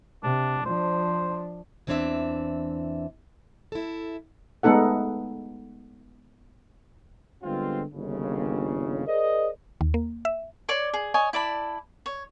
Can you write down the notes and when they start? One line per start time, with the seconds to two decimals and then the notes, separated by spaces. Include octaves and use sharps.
0.23 C3 D4
0.66 F3 D4 C5
1.87 E2 E3 A#3 C4 D4 E5
3.72 E4 A4
4.63 G#3 A3 B3 D#4 A4 F#5
7.42 D3 G3 G#3 B3 C4 F4
7.93 G1 D#2 C#3
9.06 G#4 A#4 C5 D5 D#5
9.81 D#2
9.94 A#3
10.25 E5
10.69 C#5 D5 C6
10.93 G#4
11.14 C#5 D#5 G#5
11.33 E4 D5 A5 B5
12.06 C#5